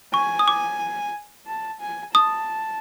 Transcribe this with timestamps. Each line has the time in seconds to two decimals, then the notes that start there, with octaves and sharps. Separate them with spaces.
0.14 G#5 C#6
0.39 D#6
0.48 D6
1.47 A5
1.81 G#5
2.14 A5 D#6